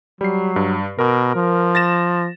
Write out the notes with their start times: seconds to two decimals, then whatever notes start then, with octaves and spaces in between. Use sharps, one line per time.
0.21 F#3 G3 C7
0.56 G2
0.99 B2 A#4
1.36 F3
1.75 A6 A#6 E7